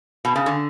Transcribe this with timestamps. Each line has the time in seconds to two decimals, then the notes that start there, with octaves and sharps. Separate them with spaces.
0.25 B2
0.36 C#3
0.46 D3